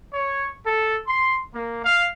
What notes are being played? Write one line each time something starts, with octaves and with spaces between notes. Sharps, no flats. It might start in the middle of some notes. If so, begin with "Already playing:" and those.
C#5
A4
C6
A#3
F5